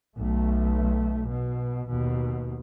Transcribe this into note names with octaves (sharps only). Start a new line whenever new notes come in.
B1 A3
B2
D#2 B2